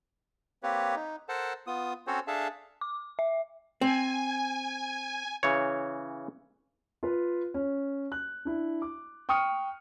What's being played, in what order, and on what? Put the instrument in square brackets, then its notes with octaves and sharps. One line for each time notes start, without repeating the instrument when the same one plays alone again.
[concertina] A#3 C4 G4 B4 C#5
D#4
A4 A#4 C5 F#5 A5
B3 F4 D#6
C4 C#4 F#4 A4 C5 C#5
D4 G#4 A4 E5 F5 A5
[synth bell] D6
E5
[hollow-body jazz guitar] C4 [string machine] G#5
[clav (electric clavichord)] C#3 E3 C#5
[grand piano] F4 B4
C#4
F#6
D4 E4
D6
G5 C#6 D#6 F6 C#7